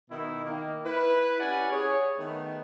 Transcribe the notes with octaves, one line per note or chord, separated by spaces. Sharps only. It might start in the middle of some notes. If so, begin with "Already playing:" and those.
B2 D#3 E4
D#3 A#3
E4 B4
C#4 G4 B4 D5 F#5 G#5
G#4 C#5
D#3 A3 B3